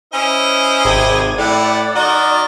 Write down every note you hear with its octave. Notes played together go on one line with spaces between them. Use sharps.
C#4 E4 C5 D#5
G#1 C3 G#6 D#7
A2 E4 G4 D5 F#5
D#3 F#4 D#5 A#5